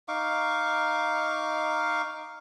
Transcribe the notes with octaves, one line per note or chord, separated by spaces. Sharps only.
D#4 F5 C#6 D6